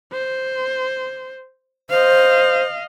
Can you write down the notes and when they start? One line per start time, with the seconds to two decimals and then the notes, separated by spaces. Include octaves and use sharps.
0.13 C5
1.90 C5 D#5 F5